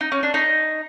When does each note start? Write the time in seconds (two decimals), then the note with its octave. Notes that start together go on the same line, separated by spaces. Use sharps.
0.01 D#4
0.12 C#4
0.23 D4
0.34 D#4